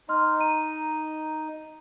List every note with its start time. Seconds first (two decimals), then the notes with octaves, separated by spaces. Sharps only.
0.09 D#4 D#5 C6 F6
0.39 A#5 D#7